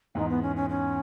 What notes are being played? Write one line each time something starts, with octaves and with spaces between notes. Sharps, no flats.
E2 G#2 D#4
B3
C#4
C#4
C#4